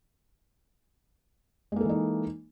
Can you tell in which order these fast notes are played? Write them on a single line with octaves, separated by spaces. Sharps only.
G#3 A#3 A4 E3 D#4